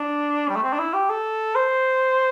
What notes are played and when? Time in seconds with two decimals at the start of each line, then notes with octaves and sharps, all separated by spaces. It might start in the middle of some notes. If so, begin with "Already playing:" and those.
Already playing: D4
0.49 G3
0.56 A3
0.63 C4
0.73 D4
0.79 E4
0.94 G4
1.10 A4
1.55 C5